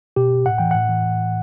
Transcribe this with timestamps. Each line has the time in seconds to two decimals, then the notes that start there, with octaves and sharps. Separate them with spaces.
0.16 B2 G4
0.45 A2 F#5
0.58 E3 G5
0.71 A2 F#5
0.89 E3